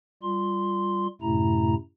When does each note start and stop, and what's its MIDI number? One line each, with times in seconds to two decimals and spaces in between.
0.23 1.07 55
0.23 1.07 65
0.23 1.07 84
1.22 1.74 42
1.22 1.74 45
1.22 1.74 48
1.22 1.74 57
1.22 1.74 64
1.22 1.74 82